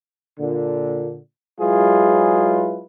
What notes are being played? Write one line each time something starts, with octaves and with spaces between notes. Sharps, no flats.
A#2 D3
F#3 G#3 E4 F4 G#4 B4